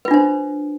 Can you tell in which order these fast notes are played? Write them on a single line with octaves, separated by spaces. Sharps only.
B4 F4 D4 C5